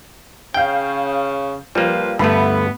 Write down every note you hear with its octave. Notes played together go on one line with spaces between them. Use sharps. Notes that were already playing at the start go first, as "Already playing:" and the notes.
C#3 F5 G5 G6
F3 G3 A#3 B4 C5 F5
D2 G2 D3 A3 B3 E5 B5